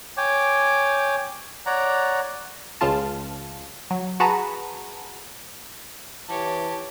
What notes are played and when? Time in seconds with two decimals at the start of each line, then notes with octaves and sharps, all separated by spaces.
0.17 C#5 G5 G#5 D6
1.66 C#5 D5 F#5 A#5
2.81 C#2 C#3 F4 A5
3.91 F#3
4.20 F#4 G#4 B4 A5 A#5
6.29 E3 G4 C#5 A5